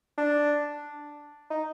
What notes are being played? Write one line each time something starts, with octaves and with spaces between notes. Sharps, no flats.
D4
D#4